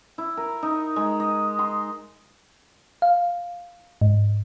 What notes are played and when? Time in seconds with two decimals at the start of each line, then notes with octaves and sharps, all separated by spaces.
0.18 E4
0.37 A#4
0.63 D#4
0.96 G#3
1.20 D#5
1.59 C6
3.02 F5
4.01 G#2